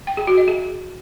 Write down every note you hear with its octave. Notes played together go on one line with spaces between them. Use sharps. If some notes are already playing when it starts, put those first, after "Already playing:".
G5
G#4
F#4
D#5
G#4